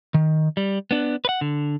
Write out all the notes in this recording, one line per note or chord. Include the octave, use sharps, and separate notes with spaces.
D#3
G3
B3 D4
B4 F#5
D3